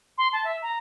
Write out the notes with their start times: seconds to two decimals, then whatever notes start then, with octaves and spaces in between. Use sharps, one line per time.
0.18 C6
0.33 A5
0.44 E5
0.62 A#5